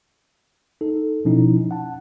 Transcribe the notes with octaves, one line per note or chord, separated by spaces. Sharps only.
D#4 A4
B2 F3 C#4 D#4 E4
F#5 A5